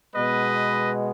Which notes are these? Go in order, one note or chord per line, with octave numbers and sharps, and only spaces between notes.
B2 G#3 B3 B4 D#5